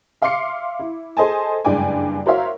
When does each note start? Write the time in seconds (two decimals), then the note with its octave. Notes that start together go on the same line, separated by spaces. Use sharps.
0.22 E5 F5 C6 D6 C7 C#7
0.79 E4
1.17 G#4 A4 C5 D#5 G#5 A5
1.64 F#1 G2 G#3 D5 G5 G#5
2.26 F#4 A#4 C5 C#5 E5 F5